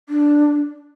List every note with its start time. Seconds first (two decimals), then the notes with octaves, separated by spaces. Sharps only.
0.09 D4